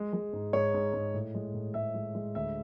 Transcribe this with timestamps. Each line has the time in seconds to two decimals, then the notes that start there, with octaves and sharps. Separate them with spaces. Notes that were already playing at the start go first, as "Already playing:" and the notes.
Already playing: G#3
0.13 G#3
0.33 G#2
0.53 G#2 C#5
0.74 G#2
0.93 G#2
1.14 A2
1.35 G#3
1.54 A2
1.74 G#3 E5
1.94 G#3
2.15 G#3
2.35 D2 E5